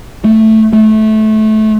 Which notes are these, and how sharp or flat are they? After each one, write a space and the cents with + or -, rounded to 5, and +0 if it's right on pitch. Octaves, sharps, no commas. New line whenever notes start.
A3 +5
A3 -20